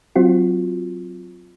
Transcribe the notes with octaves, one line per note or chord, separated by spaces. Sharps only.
F#3 C4 F4 F#4